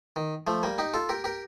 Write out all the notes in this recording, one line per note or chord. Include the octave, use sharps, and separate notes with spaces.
D#3
F3 A3
G3 A#3
D#4 G4
F4 A4
G4 A#4
G4 A#4